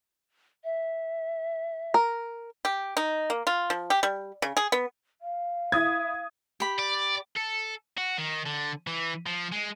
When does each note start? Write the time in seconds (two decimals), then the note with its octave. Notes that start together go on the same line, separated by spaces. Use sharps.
0.64 E5
1.94 A#4
2.65 G4
2.97 D#4
3.30 A#3
3.47 F4
3.70 F3
3.90 G4
4.03 G3
4.42 C#3
4.57 G#4
4.72 B3
5.21 F5
5.72 E4 D#6 G#6
6.60 G4 B5
6.79 D5
7.37 A4
7.98 F#4
8.18 D#3
8.46 D3
8.87 E3
9.26 F3
9.52 G#3